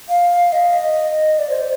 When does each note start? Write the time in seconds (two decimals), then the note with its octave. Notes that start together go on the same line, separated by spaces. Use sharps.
0.09 F5
0.53 D#5
1.39 D5
1.50 C5